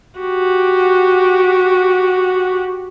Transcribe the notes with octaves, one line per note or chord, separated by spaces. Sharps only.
F#4 G4